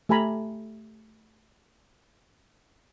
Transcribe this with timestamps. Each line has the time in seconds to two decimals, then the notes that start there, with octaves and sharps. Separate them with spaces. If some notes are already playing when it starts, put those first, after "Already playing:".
0.09 A3 G4 G#5 A#5 B5